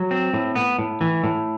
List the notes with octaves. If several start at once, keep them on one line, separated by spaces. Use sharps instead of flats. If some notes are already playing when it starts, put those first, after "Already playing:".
Already playing: F#3
C4
A2
B3
A2
E3
A2